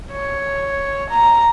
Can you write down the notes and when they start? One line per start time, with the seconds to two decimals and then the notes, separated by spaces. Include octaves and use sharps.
0.11 C#5
1.09 A#5